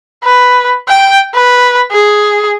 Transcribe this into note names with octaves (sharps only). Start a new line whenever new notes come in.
B4
G5
B4
G#4